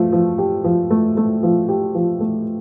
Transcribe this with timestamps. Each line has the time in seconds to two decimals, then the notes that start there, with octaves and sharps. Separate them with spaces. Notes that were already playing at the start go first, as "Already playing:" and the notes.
Already playing: F3 A3
0.12 F3
0.38 G4
0.64 F3
0.91 A3
1.17 A3
1.43 F3
1.69 G4
1.95 F3
2.20 A3